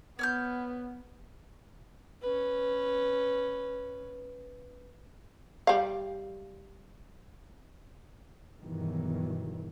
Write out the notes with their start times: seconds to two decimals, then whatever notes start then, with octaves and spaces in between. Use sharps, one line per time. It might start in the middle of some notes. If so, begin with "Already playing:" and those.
0.19 B3 C#5 F6 G6
2.22 C#4 B4
5.67 G3 F5
8.61 E2 G2 B2 D#3 E3 F#3